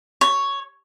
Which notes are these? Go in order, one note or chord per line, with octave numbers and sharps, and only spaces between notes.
C#5